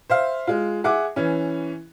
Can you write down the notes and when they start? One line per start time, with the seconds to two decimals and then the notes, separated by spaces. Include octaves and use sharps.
0.10 C5 E5 F5
0.47 G#3 F4
0.84 G#4 E5 F#5 D6
1.16 E3 C#4